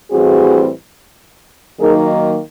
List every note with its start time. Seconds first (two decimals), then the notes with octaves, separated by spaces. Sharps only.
0.10 A2 E3 G3 C4 F#4 G#4
1.79 D#3 F#3 A#3 D#4 G#4 A#4